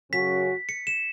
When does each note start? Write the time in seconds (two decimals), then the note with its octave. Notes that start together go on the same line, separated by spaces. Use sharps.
0.12 F#2 C#3 F#3 C#4 F#4 B6
0.69 C#7
0.87 E7